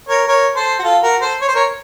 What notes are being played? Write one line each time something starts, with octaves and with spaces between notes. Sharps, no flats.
A#4 C#5
A#4 C#5
A4 C5
F#4
F4 A4
F#4 A#4
A4 C5
C#5
C5
A#4 C#5